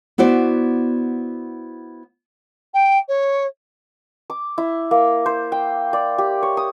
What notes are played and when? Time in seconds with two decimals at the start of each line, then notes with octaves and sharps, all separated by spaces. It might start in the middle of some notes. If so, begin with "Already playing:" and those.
0.18 B3 E4 F#4 C5 D5
2.74 G5
3.08 C#5
4.30 D6
4.58 E4
4.91 A#3
5.26 C5
5.52 G5
5.93 D5
6.18 G4
6.42 C#5
6.57 D#6